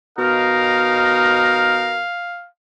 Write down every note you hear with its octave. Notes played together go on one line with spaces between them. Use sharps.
B2 D#4 A#4 F5